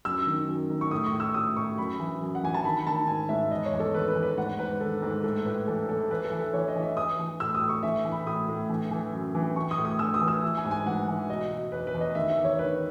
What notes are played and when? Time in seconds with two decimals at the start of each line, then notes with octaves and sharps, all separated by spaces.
0.05 F#2 E6
0.27 D#3
0.48 F#2
0.70 D#3
0.81 C#6
0.91 A2 D#6
1.06 C#6
1.13 A2
1.20 E6
1.34 A2 D#6
1.56 A2 C#6
1.78 F#2 B5
1.99 E3
2.22 F#2
2.35 F#5
2.43 E3 G#5
2.54 A5
2.64 D#3 B5
2.87 D#3 A5
3.07 G#2 G#5
3.29 G#2 E5
3.51 E2 D#5
3.65 C#5
3.73 E2
3.80 A4
3.94 D#3 B4
4.08 B4
4.15 E2
4.23 B4
4.37 G#2 F#5
4.59 G#2 B4
4.80 D#3 A4
5.02 G#2
5.24 A2 A4
5.45 A2 B4
5.67 E3 A4
5.88 E3 A4
6.10 E3 B4
6.25 A4
6.32 E3
6.39 B4
6.53 E3 C#5
6.68 D#5
6.75 E3
6.83 E5
6.97 E3 D#6
7.19 E3
7.40 A2 E6
7.55 D#6
7.62 A2
7.69 C#6
7.83 E3 E5
8.05 E3
8.12 B5
8.26 A2 D#6
8.48 A2
8.69 E3
8.91 E3
9.13 F#2
9.35 E3
9.56 E3 C#6
9.71 D#6
9.78 A2
9.85 D#6
9.99 E3 E6
10.14 D#6
10.21 E3
10.28 E6
10.43 E3
10.57 G#5
10.64 G#2
10.71 G#5
10.86 E3 F#5
11.08 E3
11.29 B2 D#5
11.50 B2
11.72 E2 B4
11.87 B4
11.94 E2
12.01 D#5
12.15 D#3 E5
12.30 E5
12.37 E2
12.44 C#5
12.59 D#3 B4